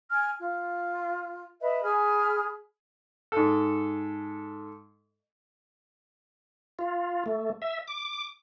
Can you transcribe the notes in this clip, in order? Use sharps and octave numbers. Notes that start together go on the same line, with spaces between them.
G#5 F6
F4
B4 D#5 E5
G#4 G#5 B5 F6
G#2 A4
F4
A3
E5
D6